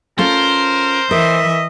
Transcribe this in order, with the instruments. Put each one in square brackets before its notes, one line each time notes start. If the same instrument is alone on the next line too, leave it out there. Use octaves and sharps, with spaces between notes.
[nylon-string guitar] C#4 F4 A4 [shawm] A#4 [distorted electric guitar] C5
[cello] E3 E5 [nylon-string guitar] A#4 [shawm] D#5